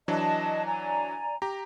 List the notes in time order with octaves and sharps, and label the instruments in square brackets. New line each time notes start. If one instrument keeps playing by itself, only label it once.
[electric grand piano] E3 F#3 D4 [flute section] D#5 A5
[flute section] D5 G#5 A#5
[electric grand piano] G4 A#5